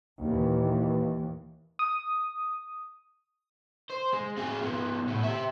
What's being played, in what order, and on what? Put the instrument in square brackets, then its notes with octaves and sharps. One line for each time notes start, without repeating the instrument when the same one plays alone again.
[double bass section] D#2 A#2 D#3 E3
[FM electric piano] D#6
[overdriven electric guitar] C5
G#3
C4 G#4
F3 B3
A2 B3
G4 E5